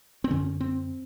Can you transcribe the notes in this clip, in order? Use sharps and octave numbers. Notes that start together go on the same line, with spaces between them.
C4
F#2 D3 C#4
C4